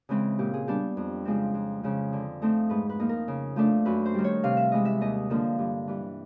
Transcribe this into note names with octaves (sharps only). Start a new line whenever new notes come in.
C#3 E3 G#3 C4
A#2 G4
G#4
G3 B3 D4 G4
F2
C#3 F3 G#3 C4
F2
C#3 F3 G#3
D3
F3 A3 C4 D#4
G#2 B4
B4
F3 A#3 D#4
A#4
C#3
F3 A3 D4
F#2 B4
C5
D#3 G3
C#5
C3 F5
E5
E3 G#3 D#5
E5
D#2 D#5
D3 F3 A#3
G2
E3 G3